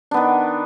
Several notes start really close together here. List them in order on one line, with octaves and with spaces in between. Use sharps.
D4 B3 D#3